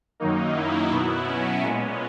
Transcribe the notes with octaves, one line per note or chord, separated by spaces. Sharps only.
F#2 D#3 F#3 A#3 D#4
E4
B2 F#3 B3 E4
C#4
A#2 G#3 B3 C#4